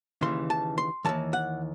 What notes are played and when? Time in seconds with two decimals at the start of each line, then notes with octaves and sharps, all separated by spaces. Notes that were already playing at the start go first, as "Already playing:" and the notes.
0.21 D#2 C#3 E3 C6
0.50 A5
0.78 C6
1.05 D#2 C#3 E3 A5
1.33 F#5